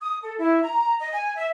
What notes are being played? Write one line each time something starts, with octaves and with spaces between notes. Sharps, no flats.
D#6
A4
E4
A#5
D#5
G#5
E5